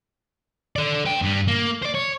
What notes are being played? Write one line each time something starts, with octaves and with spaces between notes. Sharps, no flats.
A4 D5
B4 G5
G2 G3
A#3
C5 D5
C#5